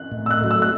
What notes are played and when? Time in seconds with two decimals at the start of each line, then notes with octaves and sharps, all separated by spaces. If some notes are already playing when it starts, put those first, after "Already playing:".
Already playing: F#6
0.12 A2
0.26 E6
0.31 F#6
0.41 F#3 A3
0.51 E6
0.62 F#6